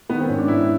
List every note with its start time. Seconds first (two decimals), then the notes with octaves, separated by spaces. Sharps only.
0.09 D#3 B3
0.20 C4
0.29 G#2 C#4
0.38 D4
0.48 G#2 E4